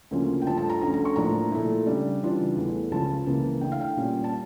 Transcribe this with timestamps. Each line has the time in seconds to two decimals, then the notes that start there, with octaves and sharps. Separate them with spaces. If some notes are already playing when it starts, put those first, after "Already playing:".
0.11 D2 C#3 F3 A#3 C#4
0.42 G5
0.46 G2 F3 A3 A5
0.58 A5
0.70 A#5
0.81 D2 D3 A3 C#4 A#5
0.94 A#5
1.05 C#6
1.16 A2 F3 A#3 D4 F4 A#5
1.52 A#2 A3 E4
1.86 C#3 G3 D4
2.22 C#3 E3 G3 D4 F4
2.56 E2 E3 A3
2.91 C#2 C#3 F3 C#4 A5
3.26 C#2 C#3 E3 A#3
3.61 D3 A3 E4 G5
3.72 F5
3.81 G5
3.96 A#2 G3 C#4
4.24 A5